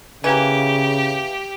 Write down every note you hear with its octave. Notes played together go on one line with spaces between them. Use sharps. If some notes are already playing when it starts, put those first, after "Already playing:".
C#3 E3 A#3 G4